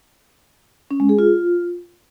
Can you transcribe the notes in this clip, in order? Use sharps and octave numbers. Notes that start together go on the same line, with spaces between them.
C#4
G#3
G#4
F4